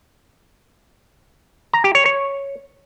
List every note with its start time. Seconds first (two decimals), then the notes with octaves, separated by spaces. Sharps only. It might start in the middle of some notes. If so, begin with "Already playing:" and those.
1.73 A#5
1.84 G4
1.95 C#5
2.06 C#5